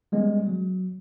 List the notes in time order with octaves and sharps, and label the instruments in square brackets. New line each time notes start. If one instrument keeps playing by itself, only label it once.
[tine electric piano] G3 G#3 B3 C#4
F#3